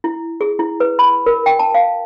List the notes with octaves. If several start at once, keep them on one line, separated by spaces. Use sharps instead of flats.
E4
G#4
E4
B4
B5
A#4
G5
A5
F5